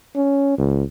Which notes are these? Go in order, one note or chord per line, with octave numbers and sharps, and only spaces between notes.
C#4
C#2